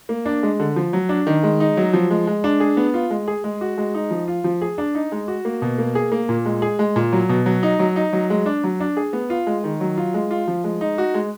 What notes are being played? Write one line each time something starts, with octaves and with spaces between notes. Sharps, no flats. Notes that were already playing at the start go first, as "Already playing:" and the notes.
A#3
D4
G#3
D3
F3
F#3
D4
D#3
G#3
D#4
F#3
F3
G#3
G#3
D4
G#4
B3
F4
G#3
G#4
G#3
F#4
G#3
D#4
F3
F4
F3
G#4
D4
D#4
G#3
F#4
A#3
B2
A#3
G#4
A#3
A#2
G#3
G#4
G#3
A#2
F#3
B2
F#3
D#4
F#3
D#4
F#3
G#3
D4
F#3
D4
G#4
B3
F4
G#3
D#3
F#3
F4
G#3
F4
F3
G#3
D#4
F#4
G#3